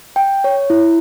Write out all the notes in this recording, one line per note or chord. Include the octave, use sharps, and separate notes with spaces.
G5
C#5
E4